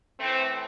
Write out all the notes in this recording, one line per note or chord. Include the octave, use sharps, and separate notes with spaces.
A2 E3 A3 C4